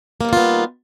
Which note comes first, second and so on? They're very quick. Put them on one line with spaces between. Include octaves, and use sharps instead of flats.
A#3 G3 D#3 F4 B3